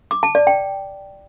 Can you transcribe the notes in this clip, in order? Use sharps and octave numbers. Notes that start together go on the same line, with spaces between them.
D6
A5
D5
G5